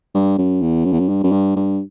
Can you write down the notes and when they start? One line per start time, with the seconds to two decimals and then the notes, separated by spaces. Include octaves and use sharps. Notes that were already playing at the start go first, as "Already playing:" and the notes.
0.15 G2
0.38 F#2
0.62 E2
0.85 F#2
0.92 E2
0.99 F#2
1.09 G2
1.24 F#2
1.32 G2
1.56 G2